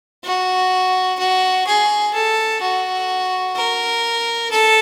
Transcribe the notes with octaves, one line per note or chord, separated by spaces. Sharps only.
F#4
F#4
G#4
A4
F#4
A#4
A4